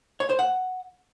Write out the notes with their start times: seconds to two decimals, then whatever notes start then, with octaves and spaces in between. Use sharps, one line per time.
0.20 C#5
0.29 C5
0.39 F#5